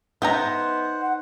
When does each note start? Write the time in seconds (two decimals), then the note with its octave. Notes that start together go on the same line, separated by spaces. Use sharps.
0.22 B3 D#4 B4 C5 E5 F#5 G5 A#5
1.02 F#5